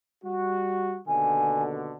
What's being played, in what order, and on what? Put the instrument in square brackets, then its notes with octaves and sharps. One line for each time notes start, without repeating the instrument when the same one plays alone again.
[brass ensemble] G3 F#4
[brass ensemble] D#2 B2 D3 [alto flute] G#5